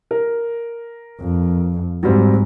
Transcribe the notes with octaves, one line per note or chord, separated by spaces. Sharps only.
A#4
F2
G#2 F#3 G3 C4